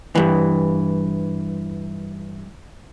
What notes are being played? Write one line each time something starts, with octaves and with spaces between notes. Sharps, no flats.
G2 E3